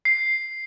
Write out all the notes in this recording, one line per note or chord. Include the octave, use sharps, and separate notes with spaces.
C7